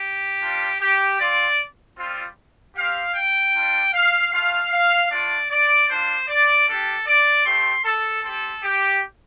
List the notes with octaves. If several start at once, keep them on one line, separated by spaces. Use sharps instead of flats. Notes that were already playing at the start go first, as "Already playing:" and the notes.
Already playing: G4
G3 D4 F4
G4
C4 F4 D5
G3 C4 F4
C4 G4 F5
G5
G3 D4 F4
F5
A3 F4 F5
F5
A3 D4 F4 D5
D5
G3 D4 F4 C5
D5
G3 D4 G4 A4
D5
A3 C4 G4 C6
A4
C4 G4 A4
G4